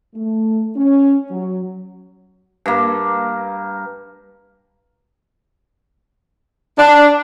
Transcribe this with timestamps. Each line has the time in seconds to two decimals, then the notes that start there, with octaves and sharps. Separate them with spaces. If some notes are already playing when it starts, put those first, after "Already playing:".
0.15 A3
0.76 C#4
1.31 F#3
2.66 G2 A#3
6.79 D4